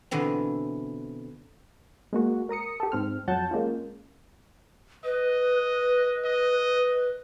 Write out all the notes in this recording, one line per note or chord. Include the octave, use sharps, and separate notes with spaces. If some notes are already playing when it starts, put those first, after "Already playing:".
B2 D3 E3 C4
G#3 A#3 F#4
A#4 A#5 D#6 C#7
G4 A4
G#2 C4 F6
F2 F#3 F#5 A5 G6
G#3 A#3 C#4 F4
B4 D#5
D#5